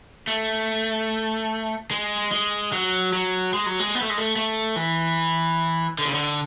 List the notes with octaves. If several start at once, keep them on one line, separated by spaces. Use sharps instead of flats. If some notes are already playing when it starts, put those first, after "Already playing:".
A3
G#3
G#3
F#3
F#3
G#3
F#3
G#3
B3
A3
G#3
A3
A3
E3
D3
C#3
D3